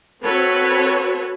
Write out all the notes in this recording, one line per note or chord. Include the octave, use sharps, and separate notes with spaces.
C4 F#4 A4 B4 C#5